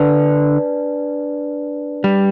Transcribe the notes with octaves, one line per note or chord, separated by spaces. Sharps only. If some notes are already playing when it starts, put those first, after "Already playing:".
Already playing: D3 D4 B4 D5 A5
G3